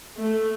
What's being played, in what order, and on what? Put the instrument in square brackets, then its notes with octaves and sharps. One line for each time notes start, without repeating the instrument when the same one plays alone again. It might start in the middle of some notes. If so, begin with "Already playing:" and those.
[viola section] A3